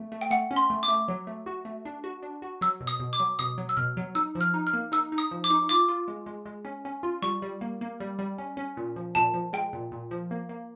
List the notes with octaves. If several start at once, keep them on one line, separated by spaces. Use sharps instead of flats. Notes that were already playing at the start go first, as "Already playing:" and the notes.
Already playing: A3
A3
G5
A3 F#5
C#4
C6
A3
D6
A3
F#3
A3
F#4
A3
D4
F#4
D4
F#4
F#3 E6
B2
D#6
B2
D6
F#3
B2 D#6
F#3
E6
B2 F6
F#3
D#4 E6
F3
F6
D#4
F6
A#3
D#4 E6
D#4
D#6
F3
D6
D#4
F4 D6
F4
G#3
G#3
G#3
C#4
C#4
F4
G3 C#6
G3
A#3
A#3
G3
G3
C#4
C#4
A#2
F3
A#2 A5
F3
G#3 G5
A#2
A#2
F3
A#3
A#3